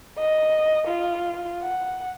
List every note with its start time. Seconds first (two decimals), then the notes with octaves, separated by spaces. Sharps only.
0.18 D#5
0.87 F4
1.63 F#5